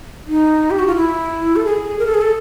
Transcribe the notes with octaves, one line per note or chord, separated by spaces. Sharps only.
D#4
G4
F#4
F4
E4
A4
G#4
A#4
A4
G#4
A4